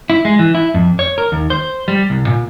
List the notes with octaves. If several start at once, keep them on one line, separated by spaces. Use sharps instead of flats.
E4
G#3
E3
E4
F2
C#5
A#4
D#2
C5
G3
C2
A#2